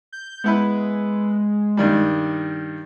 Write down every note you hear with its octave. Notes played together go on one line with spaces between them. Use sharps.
G6
G#3 B3 E4 B4
G2 D#3 G3